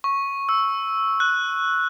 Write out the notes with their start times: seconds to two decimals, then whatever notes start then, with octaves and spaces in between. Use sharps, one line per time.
0.04 C#6
0.49 E6
1.20 F#6